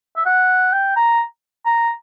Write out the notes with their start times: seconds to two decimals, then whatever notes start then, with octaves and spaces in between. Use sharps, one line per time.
0.17 E5
0.26 F#5
0.73 G5
0.96 A#5
1.66 A#5